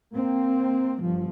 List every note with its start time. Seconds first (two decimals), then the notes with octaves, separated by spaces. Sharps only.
0.12 A#3 C4
1.00 G1 F3